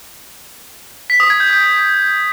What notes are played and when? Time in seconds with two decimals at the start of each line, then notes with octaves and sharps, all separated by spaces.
1.10 B6
1.20 D#6
1.30 G#6
1.40 G6
1.50 G6